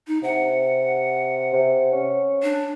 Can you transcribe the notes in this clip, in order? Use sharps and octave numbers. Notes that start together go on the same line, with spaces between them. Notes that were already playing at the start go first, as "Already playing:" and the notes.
D#4
C3 F#5
C3
C#4
D4